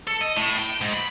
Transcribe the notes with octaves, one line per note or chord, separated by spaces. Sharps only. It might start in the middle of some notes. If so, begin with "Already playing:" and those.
A4
D#5
A2
G5
G#2
B5